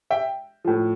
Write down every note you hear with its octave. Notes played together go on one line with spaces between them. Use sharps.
E5 G5
A2 F3